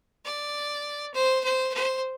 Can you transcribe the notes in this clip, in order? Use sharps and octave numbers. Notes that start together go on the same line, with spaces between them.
D5
C5
C5
C5